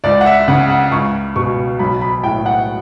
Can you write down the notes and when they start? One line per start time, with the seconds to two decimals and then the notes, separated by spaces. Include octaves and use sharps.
0.04 C#2 D5
0.21 F#5
0.26 E5
0.48 C#3 F#5
0.70 F#5
0.92 C#2 C#6
1.36 B2 C#6
1.79 B1 B5
2.01 B5
2.23 A2 G5
2.46 F#5